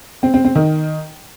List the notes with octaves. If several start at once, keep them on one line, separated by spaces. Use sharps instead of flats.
C4
C4
C4
D#3